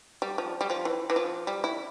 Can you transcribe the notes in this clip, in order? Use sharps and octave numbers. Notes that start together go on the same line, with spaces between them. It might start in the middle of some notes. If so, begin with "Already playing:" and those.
G3
F3
G3
F3
E3
E3
F3
G3
E4